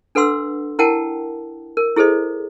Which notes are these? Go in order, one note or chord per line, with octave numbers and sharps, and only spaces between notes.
D4 A4 B4 F#5 C6 E6
E4 A#4 F#5 G5 A5
A#4
E4 G#4 A4 C5 D#5